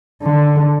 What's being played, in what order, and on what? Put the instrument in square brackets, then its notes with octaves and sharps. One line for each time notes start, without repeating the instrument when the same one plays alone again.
[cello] D3